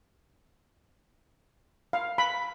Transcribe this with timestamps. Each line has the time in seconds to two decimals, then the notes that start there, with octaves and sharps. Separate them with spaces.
1.93 F5
2.18 B5